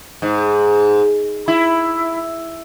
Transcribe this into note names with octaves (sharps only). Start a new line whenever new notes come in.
G#2
E4